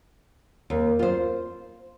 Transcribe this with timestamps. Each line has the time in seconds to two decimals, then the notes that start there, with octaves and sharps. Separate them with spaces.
0.70 D#2
0.99 F4 C5